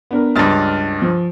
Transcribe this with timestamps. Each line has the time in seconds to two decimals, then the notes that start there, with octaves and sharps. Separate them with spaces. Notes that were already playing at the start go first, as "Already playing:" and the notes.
0.11 B3 D4 A#4
0.36 C#2 G2 F6 A6
1.02 F3